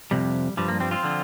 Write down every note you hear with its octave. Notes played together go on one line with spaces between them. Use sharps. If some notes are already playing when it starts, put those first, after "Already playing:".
F2 C3 G3
G2 F3 G3
A#3
G3 C4
C4 F4
D3 F3